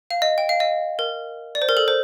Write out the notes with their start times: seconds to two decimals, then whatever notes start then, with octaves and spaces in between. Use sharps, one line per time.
0.10 F5
0.22 D#5
0.38 G5
0.49 F5
0.60 D#5
0.99 A#4
1.55 D5
1.62 C5
1.69 A#4
1.77 A4
1.88 C5